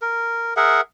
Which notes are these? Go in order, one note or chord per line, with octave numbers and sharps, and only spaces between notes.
A#4
G#4 A#4 E5 F#5